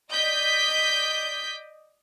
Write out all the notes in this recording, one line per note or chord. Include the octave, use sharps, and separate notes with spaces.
D5 D#5 G6 B6